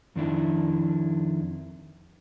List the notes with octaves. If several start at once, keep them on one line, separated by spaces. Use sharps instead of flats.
F2 D#3 D4 E4